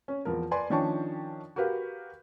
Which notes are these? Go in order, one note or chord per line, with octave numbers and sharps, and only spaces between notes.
C#4
E2 F3 A#4
B4 D5 G#5 C6
D#3 F3 C#4 D4 G5 C#6
F#4 G4 A#4 B4 F5